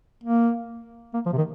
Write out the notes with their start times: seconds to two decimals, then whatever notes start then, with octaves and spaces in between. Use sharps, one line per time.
0.23 A#3
1.14 A#3
1.26 F3
1.33 C3
1.37 D#3